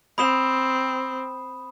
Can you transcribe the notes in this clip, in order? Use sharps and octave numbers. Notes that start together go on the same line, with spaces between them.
C4 B5 D#6 E7